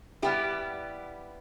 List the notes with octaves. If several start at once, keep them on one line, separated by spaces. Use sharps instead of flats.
G3 B3 E4 G4